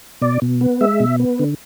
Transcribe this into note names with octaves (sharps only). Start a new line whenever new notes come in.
B2 D5
B2
B3
G#3 E5
B2
B3
D3